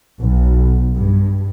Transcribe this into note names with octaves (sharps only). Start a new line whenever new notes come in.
B1
G2